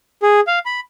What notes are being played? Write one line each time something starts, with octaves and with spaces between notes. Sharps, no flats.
G#4
F5
B5